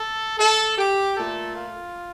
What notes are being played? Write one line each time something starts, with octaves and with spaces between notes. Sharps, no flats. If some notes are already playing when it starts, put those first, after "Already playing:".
Already playing: A4
A4
G4
A#2 A3 A4
F4